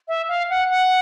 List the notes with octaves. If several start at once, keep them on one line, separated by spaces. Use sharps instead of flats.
E5
F5
F#5
F#5